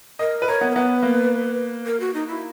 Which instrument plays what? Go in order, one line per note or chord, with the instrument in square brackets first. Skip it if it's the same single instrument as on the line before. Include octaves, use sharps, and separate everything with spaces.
[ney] A#4 [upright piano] D#5
[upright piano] B4
[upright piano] A#4 [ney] C#5
[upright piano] B3
[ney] A#4
[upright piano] B3 [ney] B4
[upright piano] A#3
[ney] A#4
F#4
D#4
E4